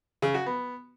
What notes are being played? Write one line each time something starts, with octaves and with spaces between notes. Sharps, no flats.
C#3
F#4
B3